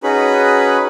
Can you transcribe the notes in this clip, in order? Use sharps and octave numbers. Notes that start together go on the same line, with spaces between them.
C#4 D#4 F#4 G#4 B4 B5